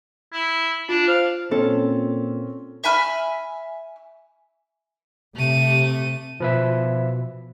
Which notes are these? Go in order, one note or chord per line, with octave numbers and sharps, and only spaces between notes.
E4
D4 F4
C5 F5
A#2 C4 C#4 A4
E5 G#5 B5 F6
C3 A3 D#7
B2 F3 B4 E5